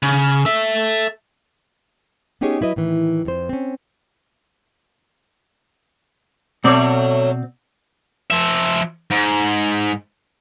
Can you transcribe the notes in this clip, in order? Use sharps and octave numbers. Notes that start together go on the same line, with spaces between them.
C#3
A4 E5
B3 C#4 D#4 G4 G#4 C#5
F#3 E4 B4 D#5
A2 D#3 E3
F2 C5
C4 C#4
B2 F#3 A3 C4 C#5 D5
F3 E5
G#2